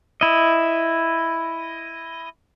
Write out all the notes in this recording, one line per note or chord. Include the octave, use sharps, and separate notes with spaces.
E4 D#5